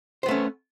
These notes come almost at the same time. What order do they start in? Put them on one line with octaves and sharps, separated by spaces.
C5 B3 A3 C#4